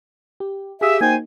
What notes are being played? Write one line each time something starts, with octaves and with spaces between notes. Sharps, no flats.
G4
G4 G#4 E5 F5 D#6
A#3 D#4 F#4 C5 G5 G#5